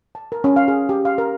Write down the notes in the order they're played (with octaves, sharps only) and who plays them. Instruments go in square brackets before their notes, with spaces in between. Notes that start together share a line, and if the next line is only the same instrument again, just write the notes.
[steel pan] A5
A#4
C#4
F5
G#4
G4
F5
A#4